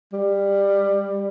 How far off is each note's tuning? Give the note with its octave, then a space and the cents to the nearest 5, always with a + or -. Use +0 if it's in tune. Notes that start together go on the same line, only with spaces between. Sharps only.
G3 +20